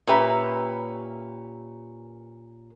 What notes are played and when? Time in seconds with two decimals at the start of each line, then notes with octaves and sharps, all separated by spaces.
0.07 A#2 C#4 G4 B4 E5 A#5